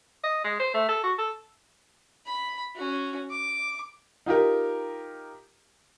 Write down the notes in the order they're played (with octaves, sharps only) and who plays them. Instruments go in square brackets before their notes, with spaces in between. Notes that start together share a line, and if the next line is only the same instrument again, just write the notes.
[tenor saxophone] D#5
G#3
C5
A3
A4
F#4
A4
[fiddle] B5
C#4 F#4
D6
[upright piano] D#4 F4 G4 A#4